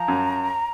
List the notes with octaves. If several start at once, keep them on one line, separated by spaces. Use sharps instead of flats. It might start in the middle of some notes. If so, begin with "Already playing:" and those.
Already playing: F3 A#5
F#2